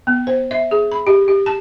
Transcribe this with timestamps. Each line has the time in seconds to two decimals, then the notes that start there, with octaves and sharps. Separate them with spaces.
0.07 B3
0.27 C5
0.51 E5
0.71 G#4
0.92 B5
1.07 G4
1.28 G4
1.46 A5